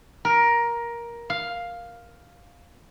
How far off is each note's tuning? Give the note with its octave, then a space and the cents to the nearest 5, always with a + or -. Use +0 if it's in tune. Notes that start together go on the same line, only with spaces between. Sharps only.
A#4 +15
F5 +5